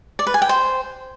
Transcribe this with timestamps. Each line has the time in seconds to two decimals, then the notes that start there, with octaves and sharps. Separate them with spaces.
0.19 D5
0.27 B4
0.34 G#5
0.42 G5
0.49 C5